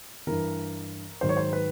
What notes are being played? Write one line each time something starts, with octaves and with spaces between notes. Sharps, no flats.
G2 E3 A#4
G#2 D#3 F#3 C5
C#5
C5
B4